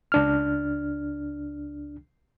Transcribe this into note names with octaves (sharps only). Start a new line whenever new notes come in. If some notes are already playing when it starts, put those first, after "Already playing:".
C#2 D4 F6